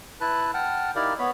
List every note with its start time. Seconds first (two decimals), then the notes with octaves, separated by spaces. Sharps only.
0.21 E4 B4 A5 F#6
0.54 F#5 G5 A5 F6
0.95 D#4 E4 G4 A#4 D5 F5
1.19 B3 C#5 B5